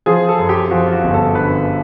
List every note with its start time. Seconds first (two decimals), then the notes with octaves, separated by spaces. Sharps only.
0.06 F3 G#4
0.29 A4
0.39 F#2
0.49 G4
0.71 F3 F#4
0.86 F4
0.92 F#4
1.03 G1
1.14 A4
1.35 D3 B4